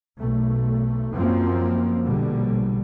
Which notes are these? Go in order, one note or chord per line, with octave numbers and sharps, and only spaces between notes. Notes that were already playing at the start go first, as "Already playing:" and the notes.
B1 A3
F#2 F3 A#3 C4
A#1 B2 D3 G3